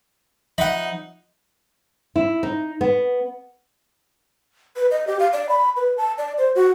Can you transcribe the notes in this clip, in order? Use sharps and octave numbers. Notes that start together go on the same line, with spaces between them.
F3 D#4 E5 F#5 B5
E4
D#4
B3
B4
D#5
G4
F5
D5
B5
B4
A5
D5
C5
F#4